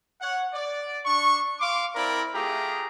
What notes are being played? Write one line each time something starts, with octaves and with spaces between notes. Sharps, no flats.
C#5 F#5
D5
D4 C#6
F5 C6 D6
C4 E4 A#4 D5 B5
A3 F4 G4 G#4 A#5